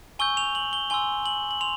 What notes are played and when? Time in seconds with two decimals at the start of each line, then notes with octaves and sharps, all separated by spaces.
0.19 G#5 C#6 E6 G6 G7
0.37 F7
0.55 F#7
0.73 G7
0.90 G#5 C6 E6 G7
1.26 F#7
1.51 F#7
1.61 C6 F7